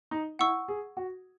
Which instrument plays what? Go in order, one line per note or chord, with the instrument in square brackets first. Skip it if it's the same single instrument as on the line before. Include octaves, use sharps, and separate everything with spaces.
[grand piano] D#4
[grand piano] E4 [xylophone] F#5 C#6 E6
[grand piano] G#4
F#4